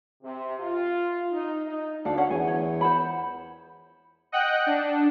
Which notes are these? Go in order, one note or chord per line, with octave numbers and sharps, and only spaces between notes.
C3
F4
D#4
D#4
D2 D4 A4 F5
C#4 F5 F#5
E2 G#5
C#5
C5 F#5 B5
D#5 F#5 G5 F#6
D4